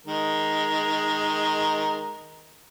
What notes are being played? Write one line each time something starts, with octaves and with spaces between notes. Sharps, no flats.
D#3 G#3 A#4